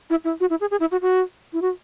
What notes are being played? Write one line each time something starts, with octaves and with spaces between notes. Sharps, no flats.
E4
E4
F#4
E4
G#4
G#4
E4
F#4
F#4
E4
F#4